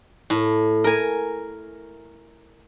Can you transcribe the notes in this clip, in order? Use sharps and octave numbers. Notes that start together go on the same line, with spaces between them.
A2
A#4 G#5